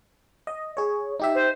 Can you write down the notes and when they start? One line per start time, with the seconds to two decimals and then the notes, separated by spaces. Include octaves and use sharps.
0.47 D#5
0.77 G#4 C#5
1.20 D#4 G4 E5
1.35 C5